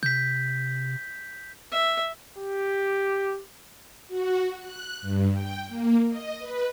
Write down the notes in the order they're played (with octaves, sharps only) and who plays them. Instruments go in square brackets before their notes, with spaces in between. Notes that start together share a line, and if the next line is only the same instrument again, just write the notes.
[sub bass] C3 [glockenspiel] G6 B6
[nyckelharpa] E5
[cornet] G4
[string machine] F#4
F#6
G2
G5
A#3
D#5
B4